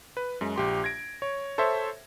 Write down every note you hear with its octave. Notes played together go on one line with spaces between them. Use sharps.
B4
F#2 G#3
A#1 G4 C6
G#6 A#6 D7
C#5
A4 C5 C#5 E5